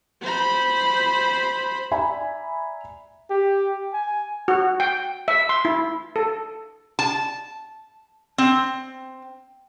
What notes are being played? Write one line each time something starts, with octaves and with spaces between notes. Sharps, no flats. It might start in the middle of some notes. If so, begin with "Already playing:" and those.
C5 B5
D5 E5 G#5 A#5 B5
G4
G#5
F#4
G5
E5
C6
E4
A4
A5
C4